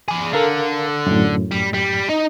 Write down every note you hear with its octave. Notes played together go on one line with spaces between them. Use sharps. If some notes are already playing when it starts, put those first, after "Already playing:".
G#4 D5
D3 A4 A#4 F5
F#2 A2
G3
G3
D#4